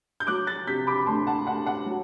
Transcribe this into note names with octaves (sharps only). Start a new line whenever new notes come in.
G6
F#3 D6 F#6
F#6 A6
C3 G6 B6
B5 D6
D2 A5 C6
F#5 A5
D2 F#5
F#5
F#3